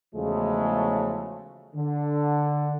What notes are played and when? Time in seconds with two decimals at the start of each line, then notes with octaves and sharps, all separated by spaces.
0.15 E2 C#3 F3 F#3 G#3 A3
1.75 D3